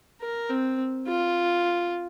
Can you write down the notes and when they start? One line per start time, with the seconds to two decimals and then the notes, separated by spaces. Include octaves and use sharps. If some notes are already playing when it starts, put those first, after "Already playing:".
0.21 A#4
0.50 C4
1.08 F4